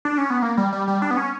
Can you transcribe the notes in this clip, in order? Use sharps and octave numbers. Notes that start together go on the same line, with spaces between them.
D4
C#4
B3
A#3
G3
G3
G3
D4
B3
C#4